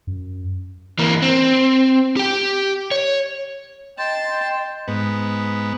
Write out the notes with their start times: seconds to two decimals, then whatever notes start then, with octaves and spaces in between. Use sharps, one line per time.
0.07 F#2
0.99 E3 A#3
1.22 C4
2.17 G4 G5
2.91 C#5
3.98 D#5 G5 A5 C6
4.30 G5
4.88 G#2 B3